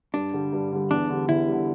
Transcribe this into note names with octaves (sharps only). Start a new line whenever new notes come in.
G2 D4
D3 G3
G2
D3 G3
E2 D4
D3 G3
E2 E4
D3 G3